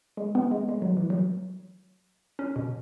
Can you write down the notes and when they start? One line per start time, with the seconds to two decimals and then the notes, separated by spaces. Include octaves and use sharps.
0.17 G#3
0.35 B3
0.51 G#3
0.69 G#3
0.82 F#3
0.97 E3
1.10 F#3
2.39 C#4
2.56 B2